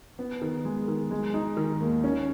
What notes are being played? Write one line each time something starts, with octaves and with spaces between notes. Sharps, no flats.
B3
D#3
G#3
D#3
G#3
D#4
D#3
D#2
C#4